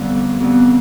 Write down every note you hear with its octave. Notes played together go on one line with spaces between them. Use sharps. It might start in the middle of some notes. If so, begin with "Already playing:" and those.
Already playing: F2 D3 G3 B3
F2 D3 G3 B3